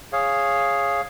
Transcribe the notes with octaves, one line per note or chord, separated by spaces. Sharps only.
G#4 C#5 F5